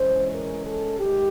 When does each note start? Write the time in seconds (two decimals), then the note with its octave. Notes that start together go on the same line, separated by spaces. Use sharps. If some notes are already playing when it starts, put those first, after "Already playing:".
Already playing: E3 G#3 C#4 C5
0.32 A#4
0.64 A4
0.97 D#3 G#3 G4